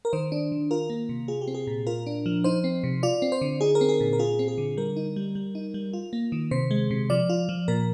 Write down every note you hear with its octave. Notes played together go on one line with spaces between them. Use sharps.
A#4
D#3 C5
D4
D#3
F4 A#4
A#3
C3
F4 G#4
G4
C4
G#4
A#2
F4 A#4
D4
F3
D#4 C5
C4
C3
F4 D5
C4
C5
D3
D#4 G#4
A#4
C4
G#4
A#2
A#4
F4 G#4
C4
G#4
D3
G3 A#4
D#4
G3
G3
D#4
G3
F4
A#3
D#3
C3 C5
G#3
C3
F3 D5
F4
F3
A#2 A#4